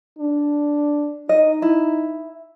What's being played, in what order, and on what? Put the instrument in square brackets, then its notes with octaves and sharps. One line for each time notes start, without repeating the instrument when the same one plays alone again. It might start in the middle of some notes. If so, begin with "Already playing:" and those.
[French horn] D4
[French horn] D#4 [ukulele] D#5
[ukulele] E4